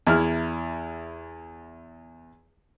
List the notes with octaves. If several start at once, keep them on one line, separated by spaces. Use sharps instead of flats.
E2 E4 F6